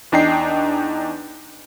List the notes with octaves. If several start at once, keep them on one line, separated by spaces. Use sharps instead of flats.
E2 D4 D#4 G5 C7